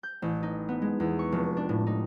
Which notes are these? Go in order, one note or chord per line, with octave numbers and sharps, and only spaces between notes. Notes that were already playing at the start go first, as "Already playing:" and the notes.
G6
A1
D#4
B3
G#3
E2
C#6
F1
D4
A2
D#4